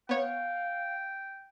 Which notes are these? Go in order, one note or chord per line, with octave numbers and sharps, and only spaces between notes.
B3 C#5 F5 G5